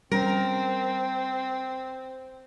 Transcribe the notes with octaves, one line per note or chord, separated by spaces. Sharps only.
G3 C4 C#4 A#4